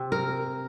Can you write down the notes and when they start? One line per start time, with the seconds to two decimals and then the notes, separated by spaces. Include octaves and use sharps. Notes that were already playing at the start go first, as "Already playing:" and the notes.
Already playing: C3
0.12 A#4